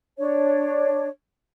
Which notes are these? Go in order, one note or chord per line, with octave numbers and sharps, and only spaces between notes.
D4 C#5